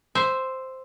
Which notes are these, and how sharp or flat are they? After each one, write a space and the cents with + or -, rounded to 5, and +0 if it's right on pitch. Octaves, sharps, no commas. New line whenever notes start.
C5 +0 E5 +0